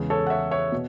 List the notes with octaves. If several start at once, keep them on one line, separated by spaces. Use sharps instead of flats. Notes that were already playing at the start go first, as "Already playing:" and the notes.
Already playing: E2 C#3 G#3
A4 C#5
F#5
C#5 E5
C#5 E5
B2